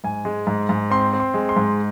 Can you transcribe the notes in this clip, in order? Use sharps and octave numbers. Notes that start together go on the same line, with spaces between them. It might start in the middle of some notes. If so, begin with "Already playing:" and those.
G#2 G#5
G#3
G#2
G#2
C4 C6
C4
C6
G#3
C6
G#2